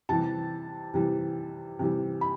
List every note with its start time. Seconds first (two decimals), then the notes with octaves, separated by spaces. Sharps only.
0.09 C3 E3 G3 A5
0.94 C3 E3 G3
1.79 C3 E3 G3
2.21 B5